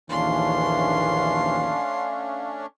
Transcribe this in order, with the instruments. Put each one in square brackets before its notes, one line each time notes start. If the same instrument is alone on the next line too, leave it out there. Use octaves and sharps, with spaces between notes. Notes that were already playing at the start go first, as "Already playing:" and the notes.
[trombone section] A#1 D#2 E3 [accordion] A3 C#4 D4 [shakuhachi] F5 [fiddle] C6